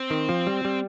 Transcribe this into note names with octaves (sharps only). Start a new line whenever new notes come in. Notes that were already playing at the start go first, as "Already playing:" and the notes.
Already playing: C4
D#3
F3
G3
G3